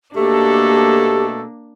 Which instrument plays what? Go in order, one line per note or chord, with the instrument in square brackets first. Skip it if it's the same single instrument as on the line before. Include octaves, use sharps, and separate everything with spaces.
[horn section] B2 A3 A4 [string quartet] A#3 D4 [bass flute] G4